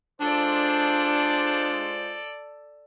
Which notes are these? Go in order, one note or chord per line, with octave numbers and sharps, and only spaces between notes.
G#3 D4 F4 A4 C5 D5